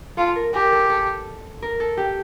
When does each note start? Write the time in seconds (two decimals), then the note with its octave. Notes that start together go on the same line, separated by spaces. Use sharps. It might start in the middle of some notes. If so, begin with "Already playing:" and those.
0.17 F4 A4
0.36 A#4
0.54 G4 A#4
0.72 A4
0.90 A4
1.62 A#4
1.80 A4
1.97 G4